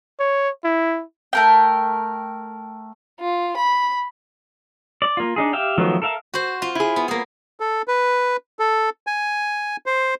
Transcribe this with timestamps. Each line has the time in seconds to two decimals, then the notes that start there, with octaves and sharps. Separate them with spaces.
0.20 C#5
0.64 E4
1.33 A3 A#4 G5
3.19 F4
3.57 B5
5.02 D5
5.17 A#3 F4
5.36 D4 D#4 G#4
5.53 G4 E5 F5 G5
5.78 D#3 F3 F#3 A3 B3
6.02 A4 A#4 E5 F5
6.34 F#4 C5
6.62 F4
6.75 E4 G#4
6.96 B3
7.08 A#3 G#4
7.60 A4
7.88 B4
8.59 A4
9.07 G#5
9.86 C5